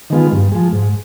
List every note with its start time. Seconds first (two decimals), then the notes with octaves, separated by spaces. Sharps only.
0.10 D#3 G#3 B3 F4
0.32 G2
0.52 F3 G#3
0.72 G#2